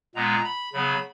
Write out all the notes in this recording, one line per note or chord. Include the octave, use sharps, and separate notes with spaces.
A#2 G#3 B3 A#5
B5
C#3 F#3 B3 B5